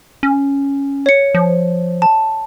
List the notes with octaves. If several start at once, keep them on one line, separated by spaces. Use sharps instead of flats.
C#4
C#5 C#7
F3
A5